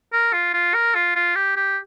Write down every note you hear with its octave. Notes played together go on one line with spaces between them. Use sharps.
A#4
F4
F4
A#4
F4
F4
G4
G4